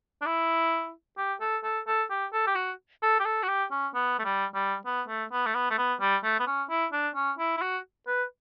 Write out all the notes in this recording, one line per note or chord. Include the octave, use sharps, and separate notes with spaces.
D4
E4
G4
A4
A4
A4
G4
A4
G4
F#4
A4
G4
A4
F#4
G4
C#4
B3
A3
G3
G3
B3
A3
B3
A3
B3
A3
B3
G3
A3
B3
C#4
E4
D4
C#4
E4
E4
F#4
B4